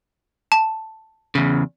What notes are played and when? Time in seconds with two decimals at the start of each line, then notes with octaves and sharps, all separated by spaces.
0.52 A5
1.35 E2 C#3